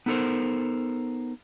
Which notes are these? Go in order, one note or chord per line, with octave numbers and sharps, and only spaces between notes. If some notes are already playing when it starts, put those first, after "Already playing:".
B3 D#4 A4 A#4 C5